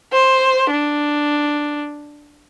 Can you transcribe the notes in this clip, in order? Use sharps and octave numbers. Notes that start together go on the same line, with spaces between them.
C5
D4